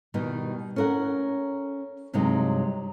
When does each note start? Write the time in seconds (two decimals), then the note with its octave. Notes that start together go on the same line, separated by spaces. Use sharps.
0.14 B2 D#3 G3 D#4
0.76 C#4 A4 A#4 D#5 F#5
2.14 G2 C3 F#3 G#3 D#4